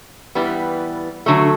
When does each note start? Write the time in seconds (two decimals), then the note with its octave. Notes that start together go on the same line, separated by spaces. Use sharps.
0.35 E3 G3 B3
1.26 D3 F#3 A3